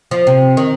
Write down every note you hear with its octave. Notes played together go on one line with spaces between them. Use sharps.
F3
C3
D#3